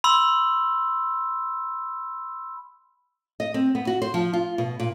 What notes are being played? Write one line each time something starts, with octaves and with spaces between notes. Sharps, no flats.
B5 C6 E6
D#5
C4
B3
F#4
C5
F3
F4
B2
A#2